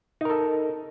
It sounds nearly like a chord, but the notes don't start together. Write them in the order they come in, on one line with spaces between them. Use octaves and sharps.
D#4 A#4 A4